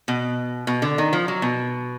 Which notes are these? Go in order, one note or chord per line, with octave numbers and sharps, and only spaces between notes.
B2
B2
D3
D#3
F3
F#3
B2